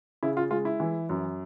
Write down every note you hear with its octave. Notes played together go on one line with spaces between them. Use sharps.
C#3 E4
F4
G#3 F4
E4
E3
F#2